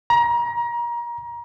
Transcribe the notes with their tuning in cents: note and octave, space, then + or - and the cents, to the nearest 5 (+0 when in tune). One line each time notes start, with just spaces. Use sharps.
A#5 +30